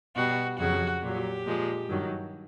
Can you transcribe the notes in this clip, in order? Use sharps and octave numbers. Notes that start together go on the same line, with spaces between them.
B2 G3 F#4
F2 C#3 F#3 F#4
A#2 F#3 G4
A#2 F3 G#3
G2 D#3 F#3